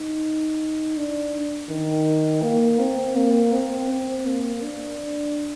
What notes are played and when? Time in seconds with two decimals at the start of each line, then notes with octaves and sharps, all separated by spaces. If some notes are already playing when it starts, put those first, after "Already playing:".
Already playing: D#4
0.97 D4
1.70 D#3
2.43 A#3
2.79 C4
3.16 A#3
3.53 C4
3.89 C4
4.26 A#3
4.63 D4